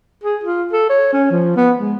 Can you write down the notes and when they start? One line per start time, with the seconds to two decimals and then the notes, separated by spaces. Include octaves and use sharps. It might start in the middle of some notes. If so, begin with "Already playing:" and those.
0.23 G#4
0.44 F4
0.73 A4
0.90 C#5
1.13 C#4
1.31 F3
1.56 B3
1.79 G#3